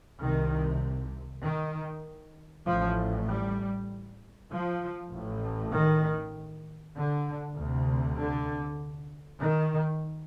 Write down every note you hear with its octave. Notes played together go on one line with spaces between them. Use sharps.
C2 C3 D#3
D#3
A1 A2 F3
G3
F3
A1 A2
D#3
D3
D2 C3
D3
D#3